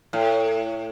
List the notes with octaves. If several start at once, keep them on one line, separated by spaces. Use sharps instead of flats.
A2